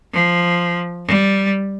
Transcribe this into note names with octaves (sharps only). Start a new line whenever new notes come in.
F3
G3